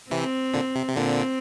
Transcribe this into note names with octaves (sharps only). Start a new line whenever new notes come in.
C3 E3 C4
A#2 D3
C3
C3
A#2 D3 C4